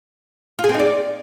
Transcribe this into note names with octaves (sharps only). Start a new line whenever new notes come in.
F4
G#4
C4
D#4
D5